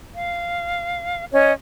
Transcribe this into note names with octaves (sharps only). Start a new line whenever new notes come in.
F5
C#4 C#5 D#5